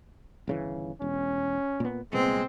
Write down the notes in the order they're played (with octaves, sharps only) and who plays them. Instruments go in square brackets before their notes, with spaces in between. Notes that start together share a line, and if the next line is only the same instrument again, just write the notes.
[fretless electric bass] G1 C#3 E3
[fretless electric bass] E1 [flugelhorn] C#4
[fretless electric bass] A#2 B3
[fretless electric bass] C2 A#2 B3 [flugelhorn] G#3 [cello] C4